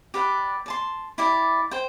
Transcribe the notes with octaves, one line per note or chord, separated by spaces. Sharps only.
G4 B4 D5 F#5
D5 A5 C6
E4 G4 D5
C5 G5